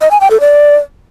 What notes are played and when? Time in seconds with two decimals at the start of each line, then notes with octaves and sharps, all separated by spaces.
0.01 D#5
0.11 G#5
0.21 G5
0.31 A4
0.40 D5